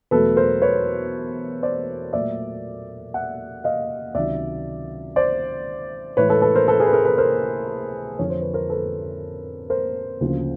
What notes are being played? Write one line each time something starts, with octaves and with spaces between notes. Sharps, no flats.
E2 B2 F#3 A3 A4 B4
A#4 C5
B4 C#5
C5 D5
A#2 F#3 A3 D5 E5
E5 F#5
D#5 F5
C#2 C3 D#3 F#3 D5 E5
C5 D5
A2 E3 G#3 B4 C#5
A4 B4
A4 B4
A#4 C5
A4 B4
G#4 A#4
B4
G#4 A#4
A4 B4
A#4 C5
F2 D3 F3 C#5
C5
B4
A#4 C5
A4 B4
A#4 C5
D2 C#3 F3 A#3